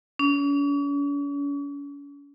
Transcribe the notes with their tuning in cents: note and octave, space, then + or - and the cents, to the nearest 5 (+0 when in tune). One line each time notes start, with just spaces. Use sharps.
C#4 +45